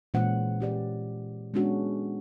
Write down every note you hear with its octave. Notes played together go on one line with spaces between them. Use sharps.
A#2 E3 G#3 C#4 C5 F#5
C#4 G4 D5
G#3 B3 C#4 D4 F#4